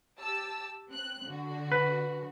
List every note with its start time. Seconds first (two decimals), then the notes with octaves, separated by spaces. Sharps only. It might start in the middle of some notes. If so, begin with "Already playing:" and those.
0.19 G4 A5 E6
0.90 C4 F#6
1.26 D3 F#4
1.72 B4